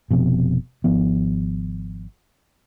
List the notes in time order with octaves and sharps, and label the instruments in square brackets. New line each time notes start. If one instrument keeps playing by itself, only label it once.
[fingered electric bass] F1 F2 B2
G#1 F3 B3